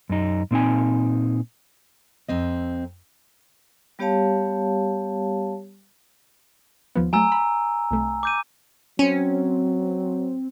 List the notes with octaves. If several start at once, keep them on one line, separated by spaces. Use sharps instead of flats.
F#2 D#4
A#2 C4 D#4 G#5
F2 C4 D#5
G3 B3 G4 C#5 F5 A5
D#2 F3 B3
F#3 A3 G#5 A#5 E6
B5
C2 A3
D6 G6 D#7
F#3 C4 C#4